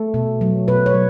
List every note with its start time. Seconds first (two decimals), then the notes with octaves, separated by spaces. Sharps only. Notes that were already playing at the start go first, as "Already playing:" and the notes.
Already playing: A3 A4
0.14 B2
0.41 F#3
0.68 B2 B4
0.86 C#5
0.94 F#3